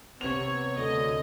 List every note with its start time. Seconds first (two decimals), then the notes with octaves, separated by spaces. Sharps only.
0.21 C3 B3 C#5 F7
0.77 D2 D3 D#5